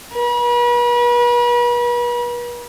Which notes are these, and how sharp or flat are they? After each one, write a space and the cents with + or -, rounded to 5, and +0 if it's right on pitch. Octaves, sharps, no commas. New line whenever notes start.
B4 -40